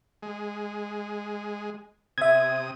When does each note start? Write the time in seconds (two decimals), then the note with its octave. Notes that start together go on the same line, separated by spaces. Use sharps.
0.22 G#3
2.18 C3 E5 D#6 G#6